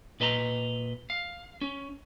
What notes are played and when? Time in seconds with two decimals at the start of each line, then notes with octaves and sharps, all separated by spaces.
0.20 A#2 B4 D#5 A5 A#5
1.10 F5
1.61 C#4